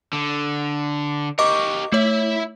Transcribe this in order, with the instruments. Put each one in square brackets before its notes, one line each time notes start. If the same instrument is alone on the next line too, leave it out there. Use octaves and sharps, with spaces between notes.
[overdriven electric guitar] D3
[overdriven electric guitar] G4 A#4 [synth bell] D#5 C#6 D6
[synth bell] A3 C#5 [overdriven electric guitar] E4 E5